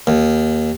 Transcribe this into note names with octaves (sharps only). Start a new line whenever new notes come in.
D#2